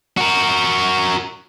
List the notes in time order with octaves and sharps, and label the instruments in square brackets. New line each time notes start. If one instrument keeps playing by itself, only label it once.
[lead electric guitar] F#4 A#4